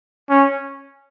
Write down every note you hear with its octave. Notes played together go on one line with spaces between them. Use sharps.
C#4